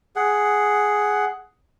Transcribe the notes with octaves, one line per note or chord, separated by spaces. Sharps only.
G#4 F#5